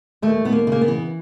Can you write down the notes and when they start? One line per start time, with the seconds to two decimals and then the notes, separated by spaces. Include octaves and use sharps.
0.22 D#2 A3
0.45 D#2 B3
0.52 A#3
0.67 C#3 A#3
0.81 B3
0.88 E3